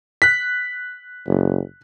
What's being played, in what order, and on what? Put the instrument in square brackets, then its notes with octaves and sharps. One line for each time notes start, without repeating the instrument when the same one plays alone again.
[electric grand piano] F#6 B6
[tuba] F#1